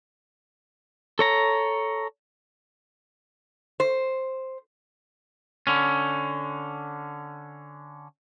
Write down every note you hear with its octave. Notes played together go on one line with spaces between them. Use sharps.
A4 C#5 A#5
C5
D3 C#4